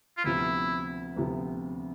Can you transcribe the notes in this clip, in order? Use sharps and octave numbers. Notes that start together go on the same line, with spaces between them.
F4
D2 C3 F3 B3 E4
D2 C3 F3 B3